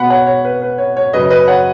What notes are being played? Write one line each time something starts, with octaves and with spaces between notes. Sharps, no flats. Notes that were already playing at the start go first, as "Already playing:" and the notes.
Already playing: B2 B3 F#5 B5
C#5 F#5
C#5
B4
B4
C#5
C#5
F#2 C#3 F#3 C#4 B4 D#5
B4 D#5
C#5 F#5